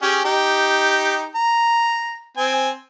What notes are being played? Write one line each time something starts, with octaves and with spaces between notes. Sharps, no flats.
C#4 G4 G#4
D#4 G4
A#5
C4 G#5